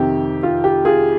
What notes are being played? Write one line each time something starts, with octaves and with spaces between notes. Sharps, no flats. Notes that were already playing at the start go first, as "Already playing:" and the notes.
Already playing: F2 C3 D#3 G4
F4
G4
F4 G#4